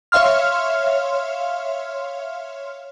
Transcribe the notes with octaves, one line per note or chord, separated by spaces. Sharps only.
C#5 E5 F5 C6 F6